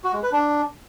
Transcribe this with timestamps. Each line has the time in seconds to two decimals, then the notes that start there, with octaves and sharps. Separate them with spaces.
0.04 F#4
0.13 G#3
0.23 B4
0.32 D4